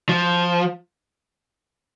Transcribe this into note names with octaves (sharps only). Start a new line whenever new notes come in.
F3